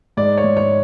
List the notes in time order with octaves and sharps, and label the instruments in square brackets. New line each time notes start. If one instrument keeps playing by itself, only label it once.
[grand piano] G#2 D5
C#5
G#2
C#5